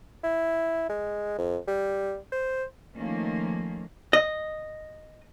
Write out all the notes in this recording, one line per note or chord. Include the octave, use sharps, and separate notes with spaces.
E4
G#3
F2
G3
C5
D#3 F3 A3 A#3 C#4
D#5